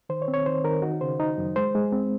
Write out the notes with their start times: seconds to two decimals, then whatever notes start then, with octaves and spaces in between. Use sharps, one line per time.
0.09 D#3 C5
0.22 C#5
0.28 C4
0.34 C#5
0.46 D#3 C5
0.64 D#3 A#4
0.82 D#4 F#4
1.01 C#3 C5
1.20 D#4
1.38 F#2
1.56 G#3 C5
1.75 G#3
1.92 C4